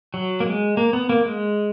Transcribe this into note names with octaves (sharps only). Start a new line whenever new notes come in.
F#3
A#3
G#3
A#3
B3
A#3
G#3